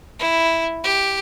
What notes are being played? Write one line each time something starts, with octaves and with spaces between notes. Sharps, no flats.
E4
G4